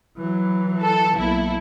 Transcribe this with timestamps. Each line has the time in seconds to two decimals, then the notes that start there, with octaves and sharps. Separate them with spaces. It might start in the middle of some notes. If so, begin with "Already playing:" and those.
0.17 E3 F#3
0.81 A4
1.17 B1 A#3 E4